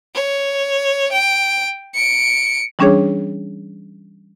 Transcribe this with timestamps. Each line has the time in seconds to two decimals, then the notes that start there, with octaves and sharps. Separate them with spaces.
0.15 C#5
1.12 G5
1.95 C#7 D7
2.79 E3 G3 C#4 D4 G#4 C#5